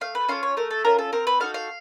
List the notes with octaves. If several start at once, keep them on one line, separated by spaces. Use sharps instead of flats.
A3 F5
B4
C#4 F4 A4 F5
C#5
A3 A#4
A4
C#4 F4 A4 A#4
A4
C4 A#4
B4
D#4 F#4 A4 F5
F5